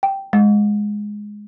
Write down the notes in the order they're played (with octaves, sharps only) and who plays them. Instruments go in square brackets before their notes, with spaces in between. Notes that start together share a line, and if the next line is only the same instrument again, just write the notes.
[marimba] G5
G#3